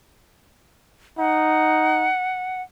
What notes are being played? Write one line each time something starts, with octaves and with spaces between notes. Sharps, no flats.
D#4 F#5